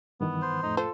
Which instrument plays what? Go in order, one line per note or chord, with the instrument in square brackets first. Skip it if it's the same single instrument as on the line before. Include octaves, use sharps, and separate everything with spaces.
[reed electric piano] G2 D#3 E3 [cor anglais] B3
[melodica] C5
[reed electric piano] F2 A2 A3 [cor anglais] D#4
[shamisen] F4 C5 [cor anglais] A4